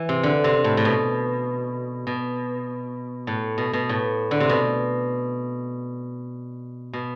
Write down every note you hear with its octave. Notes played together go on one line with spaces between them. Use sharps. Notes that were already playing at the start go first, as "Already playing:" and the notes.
Already playing: E3
C3
D3
C3
A2
A2
B2
B2
A2
B2
B2
A2
D3
C3
B2
B2